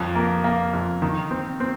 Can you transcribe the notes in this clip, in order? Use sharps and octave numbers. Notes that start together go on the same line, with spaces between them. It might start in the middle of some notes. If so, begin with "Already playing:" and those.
Already playing: F2
A#3
A#3
F2
D#3
C4
C4